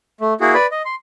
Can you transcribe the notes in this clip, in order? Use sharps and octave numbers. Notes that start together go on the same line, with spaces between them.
A3
A#3 E4 F#4 G#4
B4 D5 B5
D#5
C6